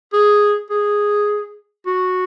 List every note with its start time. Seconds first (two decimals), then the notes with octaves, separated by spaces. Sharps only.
0.13 G#4
0.71 G#4
1.86 F#4